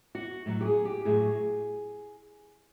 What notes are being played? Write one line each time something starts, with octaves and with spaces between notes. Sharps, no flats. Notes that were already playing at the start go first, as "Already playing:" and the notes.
F#4
A2 F#3
G4
G#4
G4
A2 F#3 G#4